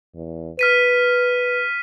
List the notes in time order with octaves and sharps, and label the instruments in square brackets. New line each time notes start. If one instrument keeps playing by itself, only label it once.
[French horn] E2
[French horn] B4 [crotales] F6 B6 D#7